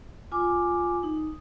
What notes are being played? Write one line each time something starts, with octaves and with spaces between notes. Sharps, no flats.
F4 G#5 D6
D#4